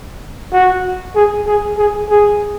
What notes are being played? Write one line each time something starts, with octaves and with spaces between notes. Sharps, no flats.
F#4
G#4
G#4
G#4
G#4